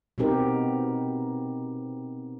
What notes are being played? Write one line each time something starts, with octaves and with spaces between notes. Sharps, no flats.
B2 B3 C4 D#4 G4 A#4